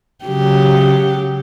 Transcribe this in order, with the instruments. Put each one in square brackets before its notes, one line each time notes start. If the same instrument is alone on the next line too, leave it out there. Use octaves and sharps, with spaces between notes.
[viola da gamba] C#3 F#3 G4